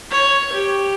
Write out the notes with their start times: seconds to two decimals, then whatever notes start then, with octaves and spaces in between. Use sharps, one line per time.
0.10 C#5
0.53 G4